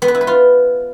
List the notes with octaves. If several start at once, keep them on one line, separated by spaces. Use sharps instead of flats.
B3
B4
E4
B4
F4